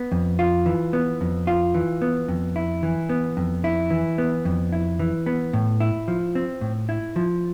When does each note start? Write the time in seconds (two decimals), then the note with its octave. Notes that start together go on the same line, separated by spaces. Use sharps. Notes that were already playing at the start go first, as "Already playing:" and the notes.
Already playing: B3
0.12 F2
0.39 F4
0.66 E3
0.93 B3
1.21 F2
1.47 F4
1.74 E3
2.02 B3
2.28 F2
2.56 E4
2.83 E3
3.09 B3
3.37 F2
3.64 E4
3.91 E3
4.18 B3
4.45 F2
4.73 E4
4.99 E3
5.26 B3
5.53 A2
5.80 E4
6.08 F3
6.35 C4
6.61 A2
6.89 E4
7.16 F3